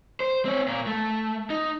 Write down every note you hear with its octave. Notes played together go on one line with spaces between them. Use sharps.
C5
C4 C#5
A#2 A#3
A3
D#4